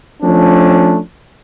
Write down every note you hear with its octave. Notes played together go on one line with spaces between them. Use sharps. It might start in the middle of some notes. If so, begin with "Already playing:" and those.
F3 A3 C#4 D4